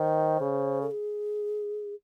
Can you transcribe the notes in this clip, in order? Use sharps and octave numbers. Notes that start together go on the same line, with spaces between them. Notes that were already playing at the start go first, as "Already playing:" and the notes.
Already playing: D#3 C5
C#3
A4
G#4